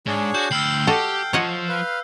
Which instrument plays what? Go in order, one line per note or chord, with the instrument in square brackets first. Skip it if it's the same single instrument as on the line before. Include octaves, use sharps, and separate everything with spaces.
[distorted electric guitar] G#2 [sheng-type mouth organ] D4 G#4 C#5
[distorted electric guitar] F#4 [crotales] G6
[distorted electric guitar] D2 B5 [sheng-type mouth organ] G5 [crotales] E6 F6 C7
[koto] F#4 A4 D#5 [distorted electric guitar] G4
[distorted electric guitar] F3 [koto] C#5 D#5 F#5
[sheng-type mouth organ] B4 F5